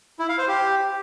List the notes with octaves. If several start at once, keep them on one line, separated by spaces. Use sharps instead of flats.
E4
F5
C5
G4